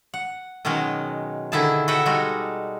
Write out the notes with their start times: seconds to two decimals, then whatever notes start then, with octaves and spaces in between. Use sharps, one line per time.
0.14 F#5
0.65 B2 D#3 F#3 G#3 C#4
1.52 D3 D#3 E4 G#4 A5
1.88 F#4 A4 B4 E5 F#5 G5
2.05 G3 G#3 D#4 F#4 A4